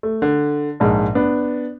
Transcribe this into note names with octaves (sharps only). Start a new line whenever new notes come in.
A3
D3
A#1 G#2 G#3
B3 D4